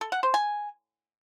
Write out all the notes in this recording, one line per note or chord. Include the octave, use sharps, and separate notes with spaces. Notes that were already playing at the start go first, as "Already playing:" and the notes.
A4
F#5
C5
G#5